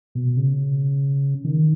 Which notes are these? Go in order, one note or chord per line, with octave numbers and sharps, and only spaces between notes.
B2
C#3
D#3